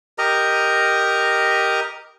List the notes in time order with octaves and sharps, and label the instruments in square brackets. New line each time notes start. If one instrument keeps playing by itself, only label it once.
[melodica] G4 A#4 D#5 A#5